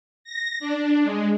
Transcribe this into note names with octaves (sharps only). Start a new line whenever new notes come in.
A#6
D4
G#3